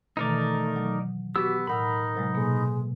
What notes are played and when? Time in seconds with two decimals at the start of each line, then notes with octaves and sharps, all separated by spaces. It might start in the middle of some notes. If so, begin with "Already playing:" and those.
0.17 B2 D#3 E3 A3 D#4 A#4 D5
0.73 B2 F#3
1.36 B3 F#4 G4 E6
1.67 A2 D#4 A#4 F#5 B5 E6
2.16 C3 F#3 G#3
2.34 B2 G#3 A#3 A4